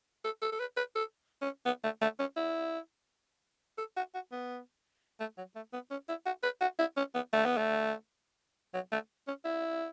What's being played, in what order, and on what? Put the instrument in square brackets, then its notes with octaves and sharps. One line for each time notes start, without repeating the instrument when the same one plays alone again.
[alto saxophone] A4
A4
A4
B4
B4
A4
C#4
B3
A3
A3
C#4
E4
A4
F#4
F#4
B3
A3
F#3
A3
B3
C#4
E4
F#4
B4
F#4
E4
C#4
B3
A3
B3
A3
F#3
A3
C#4
E4